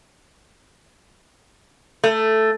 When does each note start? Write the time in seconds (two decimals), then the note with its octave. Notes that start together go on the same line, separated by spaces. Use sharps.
2.04 A3